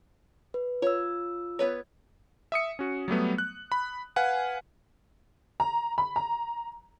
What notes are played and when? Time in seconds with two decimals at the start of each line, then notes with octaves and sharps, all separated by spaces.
0.54 B4
0.82 F4 C#5 E6
1.59 B3 B4 C#5
2.52 E5 D#6 C#7
2.79 C#4 F#4
3.08 F#3 G3 A3 B3
3.38 F#6
3.72 B5
4.16 B4 F5 F#5 G#5
5.60 A#5
5.98 B5
6.16 A#5